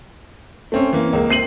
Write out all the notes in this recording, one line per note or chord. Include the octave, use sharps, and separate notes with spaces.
A3 C4 C#4
E3 A#3
C#2 A#3
C4 C7 D#7 F#7